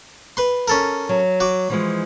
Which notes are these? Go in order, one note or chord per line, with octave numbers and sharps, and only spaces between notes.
B4 C6
C#4 A4 A#4
F#3
F#4 D6
E3 F3 G#3